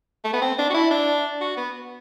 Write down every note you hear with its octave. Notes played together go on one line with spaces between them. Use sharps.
A3
B3
C4
D4
F#4
E4
D4
F#4
B3